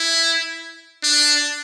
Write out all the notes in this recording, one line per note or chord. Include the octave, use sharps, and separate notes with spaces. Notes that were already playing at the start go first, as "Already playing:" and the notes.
Already playing: E4
D4